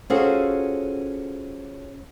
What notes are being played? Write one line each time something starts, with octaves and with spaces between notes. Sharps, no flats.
C#4 F4 F#4 G#4 A4 C5